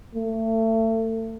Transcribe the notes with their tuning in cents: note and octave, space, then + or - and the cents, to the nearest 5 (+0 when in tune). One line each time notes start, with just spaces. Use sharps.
A3 +30